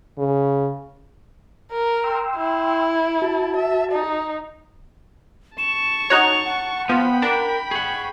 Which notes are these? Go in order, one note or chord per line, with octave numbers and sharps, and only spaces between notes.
C#3
A#4
G5 C6 E6
E4
F#4 A5
E5
D#4
A5 C#6 E7
D#4 F#4 C#5 F7
F#5
F3 B3 G5 B5
D4 A#4
G#4 F#5 C#6